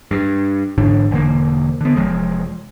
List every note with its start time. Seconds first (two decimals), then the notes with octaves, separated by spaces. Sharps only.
0.11 G2
0.78 A1 G#2 D3 D4
1.11 E1 D3 A#3
1.81 D3 B3
1.96 F1 E2 F3 G#3